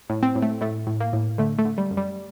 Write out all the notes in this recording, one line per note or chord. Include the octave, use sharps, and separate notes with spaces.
A2
C4
A2
A3
A2 A3
A2
A#3
A2
D3 A3
A3
D3
G3
F#2
G3